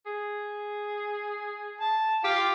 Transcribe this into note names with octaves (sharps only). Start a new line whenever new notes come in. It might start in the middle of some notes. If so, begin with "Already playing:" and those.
G#4
A5
F4 G4 F5